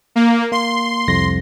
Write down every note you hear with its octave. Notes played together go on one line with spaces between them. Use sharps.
A#3
A#3 C6
C2 F2 A#6